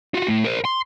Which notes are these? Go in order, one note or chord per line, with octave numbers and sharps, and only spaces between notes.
F4 F#4
A2
A#4 C5
C6